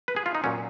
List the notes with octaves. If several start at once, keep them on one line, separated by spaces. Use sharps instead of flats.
B4
G#4
F4
D#4
A#2 F#3 C#4